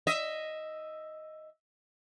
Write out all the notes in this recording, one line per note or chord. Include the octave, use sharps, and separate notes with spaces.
D#5 E5